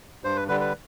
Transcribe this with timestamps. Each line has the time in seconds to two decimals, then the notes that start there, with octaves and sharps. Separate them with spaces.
0.24 G2 C5
0.36 B4
0.48 D3 G3 B4
0.60 B4